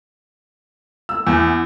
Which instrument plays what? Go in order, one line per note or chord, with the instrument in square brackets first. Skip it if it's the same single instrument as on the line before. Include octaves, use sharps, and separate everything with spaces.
[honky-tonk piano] E6
E2